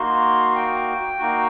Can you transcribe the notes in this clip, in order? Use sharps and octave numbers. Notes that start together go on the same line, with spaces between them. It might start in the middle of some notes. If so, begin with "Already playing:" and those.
Already playing: A#3 D#4 F#4 C6
G5
A#3 D#4 F#4